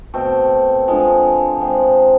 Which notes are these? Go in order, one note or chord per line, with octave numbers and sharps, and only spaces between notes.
B2 A3 C4
D3 F3 G#3
C3 G#3 C4